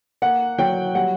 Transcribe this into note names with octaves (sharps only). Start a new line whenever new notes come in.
A#3 F#5
F#3 G5
G3 F#5